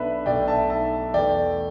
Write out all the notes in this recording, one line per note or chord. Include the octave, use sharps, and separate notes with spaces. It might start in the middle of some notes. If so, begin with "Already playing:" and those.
Already playing: B1 B2 A3 D4 B4 E5
B1 B2 A3 D5 G5
E5 A5
E5 A5
E2 B2 A3 D5 G5